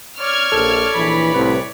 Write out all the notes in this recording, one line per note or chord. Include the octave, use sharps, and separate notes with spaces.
C#5 D5 F6 G#6
A#1 A4
A#1 E3 B5
C2 A2 C4 B4